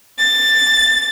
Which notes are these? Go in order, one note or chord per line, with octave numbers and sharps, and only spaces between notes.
A6